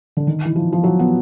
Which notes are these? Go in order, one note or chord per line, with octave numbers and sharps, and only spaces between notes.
D3
D#3
E3
F3
F3
F#3
B3